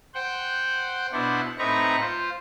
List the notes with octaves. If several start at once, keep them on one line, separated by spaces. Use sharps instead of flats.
C5 F#5 G5
B2 D4 E4 C5 F#5
A2 C4 D#4 B4 A#5 C#6
F4 C5